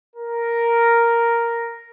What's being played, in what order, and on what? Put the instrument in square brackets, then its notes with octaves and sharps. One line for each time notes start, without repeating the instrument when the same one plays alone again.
[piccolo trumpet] A#4